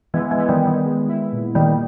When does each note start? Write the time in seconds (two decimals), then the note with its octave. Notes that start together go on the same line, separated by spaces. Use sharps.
0.14 E3 G#3 B3
0.31 E3 G#3
0.38 B3
0.49 D#3 G3
0.61 B3
0.67 D#3
0.85 G#3
1.08 E4
1.32 A#2
1.55 D#3 G3 A#3